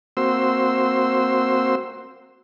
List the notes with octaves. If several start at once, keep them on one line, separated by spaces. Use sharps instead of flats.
A#3 C4 F#4 C5 C6 E6